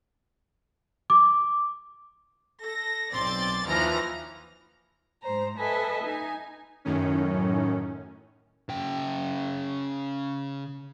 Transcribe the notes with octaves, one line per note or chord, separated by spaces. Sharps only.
D6
A4 A#6
B1 C4 D5 C6 A6
D#2 E3 F3 A#5 F6 A#6
G#2 C5 A#5
A4 B4 D#5 E5 G#5
D#4 G#5
F#2 A2 D#3 C#4
C#3 G5